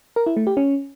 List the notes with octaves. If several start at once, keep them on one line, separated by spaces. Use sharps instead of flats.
A#4
E4
A3
G4
C#4